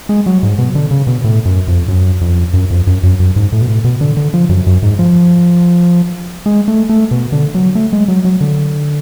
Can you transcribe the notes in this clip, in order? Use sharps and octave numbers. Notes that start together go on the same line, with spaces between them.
G#3
F#3
G#2
B2
D3
C#3
B2
A2
F#2
F2
F#2
F2
F#2
F2
F#2
F#2
F#2
G#2
A2
B2
A2
B2
D3
D3
F3
F#2
F#2
G#2
F3
G#3
A3
A3
B2
D3
F#3
A3
G#3
F#3
F#3
D3